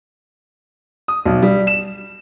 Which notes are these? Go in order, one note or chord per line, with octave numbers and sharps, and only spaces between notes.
D#6
B1
G3
E7